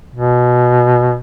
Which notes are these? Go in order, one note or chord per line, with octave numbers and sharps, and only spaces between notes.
B2